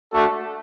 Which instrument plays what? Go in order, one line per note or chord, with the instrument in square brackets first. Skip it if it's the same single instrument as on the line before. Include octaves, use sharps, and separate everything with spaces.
[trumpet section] A3 D4 F#4 A4